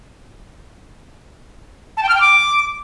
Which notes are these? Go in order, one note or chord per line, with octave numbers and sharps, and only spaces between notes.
A5
G5
F6
G5
D6